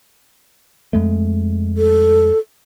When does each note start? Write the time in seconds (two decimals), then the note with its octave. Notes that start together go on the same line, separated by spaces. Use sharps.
0.93 F2 G#3 A3
1.77 A4